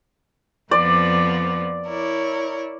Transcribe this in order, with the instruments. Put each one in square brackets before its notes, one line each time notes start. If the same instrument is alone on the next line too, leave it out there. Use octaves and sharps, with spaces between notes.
[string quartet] F2 F3 B3 [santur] D5
[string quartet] E4 A#4 C#5